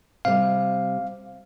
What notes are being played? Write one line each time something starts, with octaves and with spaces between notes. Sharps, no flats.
C3 G3 F5